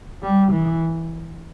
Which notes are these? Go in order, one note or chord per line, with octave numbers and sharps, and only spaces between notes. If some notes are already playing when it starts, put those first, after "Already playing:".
G3
E3